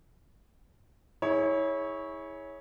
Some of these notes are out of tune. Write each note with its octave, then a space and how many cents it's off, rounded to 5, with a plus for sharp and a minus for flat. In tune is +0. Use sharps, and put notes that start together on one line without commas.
E4 -30 G#4 +0 C#5 +0